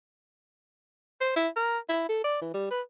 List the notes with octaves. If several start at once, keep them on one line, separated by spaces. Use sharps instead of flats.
C5
E4
A#4
E4
A4
D5
E3
G3
B4